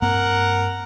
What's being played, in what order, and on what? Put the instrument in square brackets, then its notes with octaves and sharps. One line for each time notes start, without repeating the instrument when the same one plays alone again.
[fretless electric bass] G2 A#3 C4 [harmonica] A#4 F#5